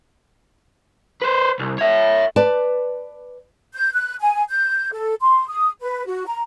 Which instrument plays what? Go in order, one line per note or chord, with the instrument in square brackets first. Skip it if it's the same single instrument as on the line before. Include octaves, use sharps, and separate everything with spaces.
[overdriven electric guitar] B4 C5
C2
C#5 E5
[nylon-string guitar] B4 D5 A5
[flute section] G6
F#6
G#5
G6
A4
C6
D#6
B4
F#4
A#5